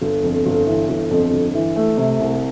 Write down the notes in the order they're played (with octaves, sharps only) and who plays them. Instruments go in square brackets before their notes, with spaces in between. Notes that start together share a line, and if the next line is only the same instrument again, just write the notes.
[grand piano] G1
F2
G1
E3
G1
F2
G1
E3
A3
C3
C2